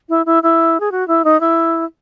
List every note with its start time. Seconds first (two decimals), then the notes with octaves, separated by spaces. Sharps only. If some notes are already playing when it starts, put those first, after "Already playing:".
0.09 E4
0.26 E4
0.43 E4
0.80 G#4
0.92 F#4
1.08 E4
1.24 D#4
1.40 E4